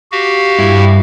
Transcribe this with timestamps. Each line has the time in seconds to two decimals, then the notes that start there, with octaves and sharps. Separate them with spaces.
0.12 F#4 G4 F5
0.59 G2 E4